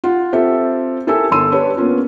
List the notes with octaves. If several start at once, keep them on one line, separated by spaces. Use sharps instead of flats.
F4 F#5
C4 F4 G4 A4 E5
E4 G4 A4 A#4 G#5 E6
G1 A4 C6 E6 D#7
D4 G4 B4 C#5
A#3 B3 C#4 F4